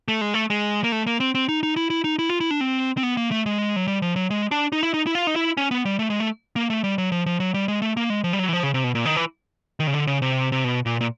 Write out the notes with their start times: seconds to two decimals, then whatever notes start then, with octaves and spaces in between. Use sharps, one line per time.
0.08 A3
0.21 G#3
0.34 A3
0.50 G#3
0.84 A#3
0.92 A3
1.07 A#3
1.20 C4
1.35 C4
1.49 D#4
1.63 D#4
1.76 E4
1.90 E4
2.04 D#4
2.19 E4
2.30 F4
2.40 E4
2.51 D4
2.61 C4
2.97 C4
3.03 B3
3.17 A#3
3.31 A3
3.46 G#3
3.76 F#3
3.87 G3
4.02 F3
4.16 F#3
4.30 G#3
4.51 D4
4.72 D#4
4.83 E4
4.94 D#4
5.07 E4
5.15 F4
5.27 D#4
5.36 E4
5.57 C#4
5.71 B3
5.85 G3
5.99 A3
6.10 G#3
6.20 A3
6.56 A#3
6.70 A3
6.84 G3
6.98 F#3
7.12 F3
7.26 F3
7.40 F#3
7.54 G3
7.68 G#3
7.82 A3
7.97 A#3
8.10 G#3
8.24 F3
8.33 G3
8.39 F#3
8.49 E3
8.53 F3
8.63 C#3
8.74 C3
8.84 B2
8.95 A#2
9.05 D#3
9.16 E3
9.80 D#3
9.87 C#3
9.94 D3
10.07 C#3
10.22 C3
10.52 C3
10.64 B2
10.86 A#2
11.01 A#2